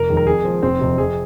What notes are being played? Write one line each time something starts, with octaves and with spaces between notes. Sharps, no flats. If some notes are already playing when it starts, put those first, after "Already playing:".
Already playing: F1 A#4
F2 D#3 G#3
A#4
F2 G#4
F3 G#3
F1 C4
F2 C3
F2 G#4